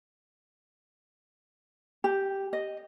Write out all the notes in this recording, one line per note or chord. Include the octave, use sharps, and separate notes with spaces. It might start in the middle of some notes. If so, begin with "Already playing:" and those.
G4
D#5